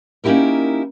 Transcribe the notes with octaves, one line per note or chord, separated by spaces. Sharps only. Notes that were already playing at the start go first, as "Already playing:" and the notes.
A#3 C#4 D#4 E4 G4 A#4